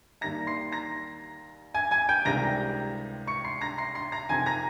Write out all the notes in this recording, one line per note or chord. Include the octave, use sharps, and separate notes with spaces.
D#2 D#3 G3 A#5 A#6
C6 C7
A#5 A#6
G#5 G#6
G#5 G#6
G5 G6
C#2 C3 D#3 G3 A#5 A#6
C#6 C#7
C6 C7
A#5 A#6
C6 C7
C6 C7
A#5 A#6
F2 C3 D#3 G#5 G#6
A#5 A#6